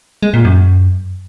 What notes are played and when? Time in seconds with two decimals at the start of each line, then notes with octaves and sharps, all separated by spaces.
0.23 G#3
0.34 A#2
0.45 F#2